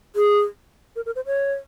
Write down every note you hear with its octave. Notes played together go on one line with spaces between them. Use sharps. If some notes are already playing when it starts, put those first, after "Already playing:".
G#4
A#4
A#4
C5
C#5